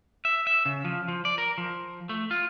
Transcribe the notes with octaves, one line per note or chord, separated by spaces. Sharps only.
E5
E5
C#3
F3
F3
D5
A#4
F3
A3
F4